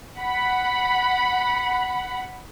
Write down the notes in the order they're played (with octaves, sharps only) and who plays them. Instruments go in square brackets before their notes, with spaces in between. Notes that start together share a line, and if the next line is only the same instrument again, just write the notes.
[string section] F#5 B5